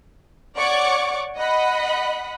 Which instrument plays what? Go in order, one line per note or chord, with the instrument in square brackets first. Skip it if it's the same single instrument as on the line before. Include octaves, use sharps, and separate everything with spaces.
[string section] C#5 D5 F#5 C#6 D6
D#5 F#5 B5